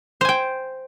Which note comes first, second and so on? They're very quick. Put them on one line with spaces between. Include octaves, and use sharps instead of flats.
C5 G#5 G5